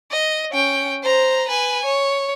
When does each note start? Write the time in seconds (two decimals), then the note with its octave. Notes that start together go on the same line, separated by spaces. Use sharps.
0.11 D#5
0.52 C#4 G5
1.03 C5 A#5
1.49 B4 G#5
1.85 C#5